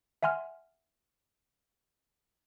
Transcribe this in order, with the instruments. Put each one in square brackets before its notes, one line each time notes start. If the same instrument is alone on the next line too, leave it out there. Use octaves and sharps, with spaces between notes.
[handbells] E5 F#5 G#5 C6 F6